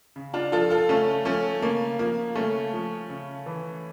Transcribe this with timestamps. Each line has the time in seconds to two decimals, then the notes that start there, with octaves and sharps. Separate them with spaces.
0.16 C#3
0.34 D4 F4
0.52 F3 F4 A4
0.70 F4 A4
0.89 C#3 A3 C#4
1.25 F3 A3 C#4
1.62 C#3 A#3
1.99 F3 A#3
2.35 C#3 A3 C#4
2.73 F3
3.10 C#3
3.46 E3